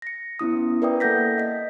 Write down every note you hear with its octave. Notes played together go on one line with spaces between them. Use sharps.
A#6 C#7
B3 C#4 E4 D#6
A#4 B4 D5 E5 G5 D#6
A#3 A4 F#5 G6 A#6 B6
D#5 B6